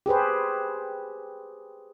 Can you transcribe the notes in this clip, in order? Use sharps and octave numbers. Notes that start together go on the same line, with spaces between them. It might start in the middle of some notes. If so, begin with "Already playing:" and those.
G4 G#4 B4 C5